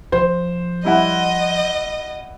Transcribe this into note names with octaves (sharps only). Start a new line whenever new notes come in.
F3 C5
G3 E4 D#5 F#5